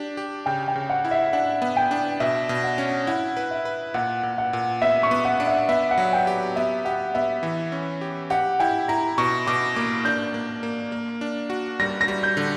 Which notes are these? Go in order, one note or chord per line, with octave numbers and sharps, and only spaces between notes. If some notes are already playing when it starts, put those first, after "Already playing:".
Already playing: D4 G4
G4
C#3 G5
G5
C#3
F#5
E4
E5
D4 F#5
B3
G5
D4
B2 E5
B2
F#5
C#4
E4 F#5
B4
E5
B4
A#2 F#5
A#2
F#5
A#2
B3 E5
C#6
B3
F#5
D4
E5
B3 E5
F#5
F#3
G5
G4
B3 E5
G4 F#5
B3 E5
E3
C#4
G4
G4 F#5
E4 G5
E4 A#5
B2 C#6
B2 D6
A#3 D6
D4 G6
A#3
A#3
A#3
D4
F#4
G3 A#6
A#6
G3
G6
D3